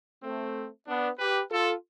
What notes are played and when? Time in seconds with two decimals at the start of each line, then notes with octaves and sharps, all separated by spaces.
0.23 A3 C4
0.87 B3 D4
1.19 G4 B4
1.51 F4 A4